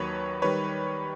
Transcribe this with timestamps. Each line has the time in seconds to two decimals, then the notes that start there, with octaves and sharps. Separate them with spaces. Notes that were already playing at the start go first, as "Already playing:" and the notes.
Already playing: D#2 D#3 F#3 B4 C#5
0.42 D#3 G3 B4 C#5